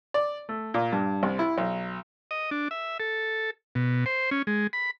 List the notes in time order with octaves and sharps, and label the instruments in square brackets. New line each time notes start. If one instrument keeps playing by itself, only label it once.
[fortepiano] D5
A3
A#2
G2
C2
E4
B1
[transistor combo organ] D#5
D4
E5
A4
B2
C5
C#4
G#3
B5